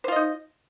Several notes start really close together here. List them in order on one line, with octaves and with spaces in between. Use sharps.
C5 F4 D#5 D#4